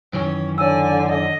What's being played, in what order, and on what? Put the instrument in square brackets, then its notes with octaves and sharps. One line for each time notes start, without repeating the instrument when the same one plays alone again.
[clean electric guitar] F#2 D#3 E3 [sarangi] C#4
[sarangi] D3 [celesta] C#5 E6 [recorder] G#5
[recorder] D#5